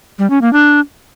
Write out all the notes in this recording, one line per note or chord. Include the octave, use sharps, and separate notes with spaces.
G3
C#4
A#3
D4